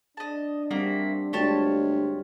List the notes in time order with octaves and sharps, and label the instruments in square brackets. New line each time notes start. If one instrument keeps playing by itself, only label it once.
[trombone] D4 [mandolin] D#5 A5
[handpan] G3 C4 [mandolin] A#3 F#4 E5
[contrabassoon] D2 [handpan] G#3 F4 [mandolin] G4 C#5 A5